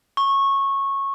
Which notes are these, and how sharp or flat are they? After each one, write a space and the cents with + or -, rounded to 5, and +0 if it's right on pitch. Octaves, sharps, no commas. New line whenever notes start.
C#6 -15